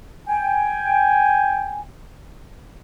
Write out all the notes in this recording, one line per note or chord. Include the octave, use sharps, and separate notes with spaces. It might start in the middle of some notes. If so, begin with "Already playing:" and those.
G5 G#5